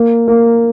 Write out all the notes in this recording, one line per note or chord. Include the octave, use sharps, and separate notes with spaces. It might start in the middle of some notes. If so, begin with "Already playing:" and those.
Already playing: A#3
A#3